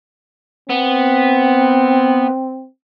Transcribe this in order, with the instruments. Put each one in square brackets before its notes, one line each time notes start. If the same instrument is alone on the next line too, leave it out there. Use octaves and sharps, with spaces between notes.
[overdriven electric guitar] B3 [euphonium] C4